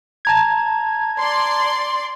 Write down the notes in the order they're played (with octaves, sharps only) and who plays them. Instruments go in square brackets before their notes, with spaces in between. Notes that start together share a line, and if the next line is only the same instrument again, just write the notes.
[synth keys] A5 A#5 G#6
[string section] D5 C6